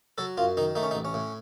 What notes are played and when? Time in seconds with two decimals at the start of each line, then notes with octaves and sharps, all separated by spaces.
0.18 F#3 A4
0.38 F#2 F4
0.57 D#3 D#4
0.75 A3 D#4
0.83 C#4
0.91 D#4
0.95 A1
1.05 C#4
1.14 A2